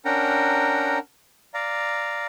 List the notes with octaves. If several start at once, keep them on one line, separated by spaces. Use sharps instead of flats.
C#4 D4 A#4 F#5 G5 A#5
D5 F5 A#5